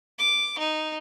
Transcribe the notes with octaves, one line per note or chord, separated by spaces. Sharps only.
D6
D#4